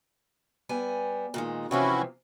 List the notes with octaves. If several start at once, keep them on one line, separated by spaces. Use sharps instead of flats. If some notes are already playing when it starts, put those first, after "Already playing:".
G3 B3 G#5
A#2 D#3 G#3
C3 E3 F3 C#4 E4 F#4